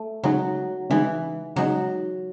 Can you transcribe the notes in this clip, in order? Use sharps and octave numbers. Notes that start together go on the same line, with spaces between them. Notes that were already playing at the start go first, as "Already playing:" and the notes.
Already playing: A3
C#3 F#3 G#3 D#4
C#3 E3 G#3 D#4
C#3 F#3 G#3 D#4